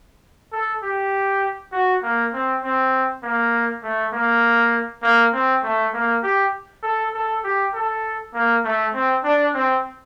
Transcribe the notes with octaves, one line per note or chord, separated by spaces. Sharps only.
A4
G4
F#4
A#3
C4
C4
A#3
A3
A#3
A#3
C4
A3
A#3
G4
A4
A4
G4
A4
A#3
A3
C4
D4
C4